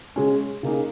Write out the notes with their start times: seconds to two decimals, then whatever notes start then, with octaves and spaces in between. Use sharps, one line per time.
0.16 C#3 G#3 C#4
0.63 C#3 A#3 D#4 G#4